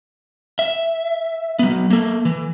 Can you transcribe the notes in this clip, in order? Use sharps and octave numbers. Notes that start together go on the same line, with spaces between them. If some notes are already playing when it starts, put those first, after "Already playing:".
E5
F#3 B3
A#3 A4
E3